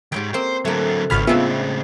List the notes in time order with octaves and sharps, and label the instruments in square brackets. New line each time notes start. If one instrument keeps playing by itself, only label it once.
[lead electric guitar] D#2 G#2 [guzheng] G4 C#5 G5
[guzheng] A#3 C4 [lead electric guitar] C5
[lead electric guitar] D3 F#3 [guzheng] A3 A#3
[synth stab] G#1 B5 F6 [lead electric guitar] C#2 [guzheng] G#4 B4 C#5
[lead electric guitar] A2 C#3 [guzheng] G#3 C4 D4 [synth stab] B3 F4 E5